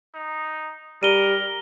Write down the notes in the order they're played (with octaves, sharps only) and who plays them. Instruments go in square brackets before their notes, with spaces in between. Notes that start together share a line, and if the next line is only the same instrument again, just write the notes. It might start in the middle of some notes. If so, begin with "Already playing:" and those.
[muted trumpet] D#4
[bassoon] G3 [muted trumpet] A#4 [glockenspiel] D#7 G7